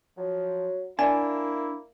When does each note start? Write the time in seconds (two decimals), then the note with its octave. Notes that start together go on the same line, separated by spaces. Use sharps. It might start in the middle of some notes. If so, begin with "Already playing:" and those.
0.17 F3 F#3
0.99 A#3 D4 E4 G#5